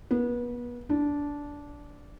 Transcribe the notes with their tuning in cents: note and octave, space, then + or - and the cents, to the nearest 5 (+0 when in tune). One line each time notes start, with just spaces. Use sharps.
B3 -30
D4 -15